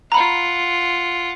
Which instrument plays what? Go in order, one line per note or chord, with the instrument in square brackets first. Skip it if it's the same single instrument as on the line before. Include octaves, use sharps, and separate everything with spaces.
[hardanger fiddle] F4 F#5 [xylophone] A#5 B5